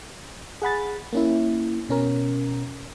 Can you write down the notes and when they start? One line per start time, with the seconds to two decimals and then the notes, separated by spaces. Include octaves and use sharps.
0.62 G#4 F#5 B5 A6
1.13 A#3 C#4 E4
1.89 B2 C#4 A#4